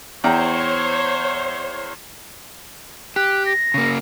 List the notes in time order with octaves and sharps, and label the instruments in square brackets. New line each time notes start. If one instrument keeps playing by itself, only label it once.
[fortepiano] E2 G5 A#5 [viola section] C5 C#5
[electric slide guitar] G4 [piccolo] F#6
[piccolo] A#6
[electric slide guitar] C#3 A#3